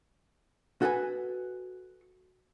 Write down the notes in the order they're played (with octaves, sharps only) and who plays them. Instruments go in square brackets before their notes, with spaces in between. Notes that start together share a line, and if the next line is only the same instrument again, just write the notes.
[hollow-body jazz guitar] F#4 A4 B4 G#5